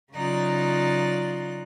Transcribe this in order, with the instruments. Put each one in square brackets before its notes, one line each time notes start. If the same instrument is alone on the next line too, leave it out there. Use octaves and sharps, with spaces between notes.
[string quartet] C#3 F#3 D#4 F4 D5 F#6